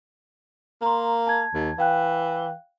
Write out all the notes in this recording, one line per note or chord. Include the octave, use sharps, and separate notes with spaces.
A#3 A#5 C6
A5 G#6
D#2
E3 F5 G5 F#6